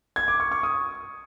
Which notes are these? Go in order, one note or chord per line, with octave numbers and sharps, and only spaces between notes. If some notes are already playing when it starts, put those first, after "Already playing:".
G#6
D6
C#6
C#6
D#6